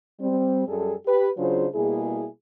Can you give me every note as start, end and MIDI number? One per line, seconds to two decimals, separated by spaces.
0.20 0.62 55
0.20 0.62 60
0.67 0.94 42
0.67 0.94 55
0.67 0.94 68
0.67 0.94 69
1.06 1.29 67
1.06 1.29 71
1.38 1.67 49
1.38 1.67 54
1.38 1.67 62
1.38 1.67 65
1.38 1.67 68
1.38 1.67 72
1.74 2.27 47
1.74 2.27 55
1.74 2.27 58
1.74 2.27 64
1.74 2.27 68